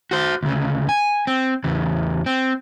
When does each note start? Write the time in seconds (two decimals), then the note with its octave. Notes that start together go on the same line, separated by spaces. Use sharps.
0.11 F#4 C5
0.43 D2 C#3
0.89 G#5
1.27 C4
1.64 E2 C#3
2.26 C4